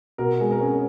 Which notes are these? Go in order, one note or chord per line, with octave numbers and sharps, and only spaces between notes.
B2 A#4
G#3
A#4
C#4